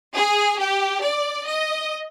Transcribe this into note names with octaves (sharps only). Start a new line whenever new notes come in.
G#4
G4
D5
D#5